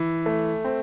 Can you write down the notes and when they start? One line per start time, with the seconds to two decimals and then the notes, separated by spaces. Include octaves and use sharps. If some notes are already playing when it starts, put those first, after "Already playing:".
Already playing: E3
0.26 A3
0.64 C4